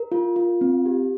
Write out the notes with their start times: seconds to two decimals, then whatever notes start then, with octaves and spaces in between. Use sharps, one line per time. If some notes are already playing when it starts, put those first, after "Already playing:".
Already playing: A#4
0.12 F4
0.36 F4
0.61 C4
0.86 G4